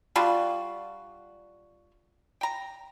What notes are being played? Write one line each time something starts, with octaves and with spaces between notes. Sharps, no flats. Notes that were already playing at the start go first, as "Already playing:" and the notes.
G3 D4 F4 F#4
G5 A#5